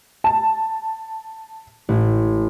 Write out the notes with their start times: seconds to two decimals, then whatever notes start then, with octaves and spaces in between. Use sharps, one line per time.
0.24 A5
1.89 A1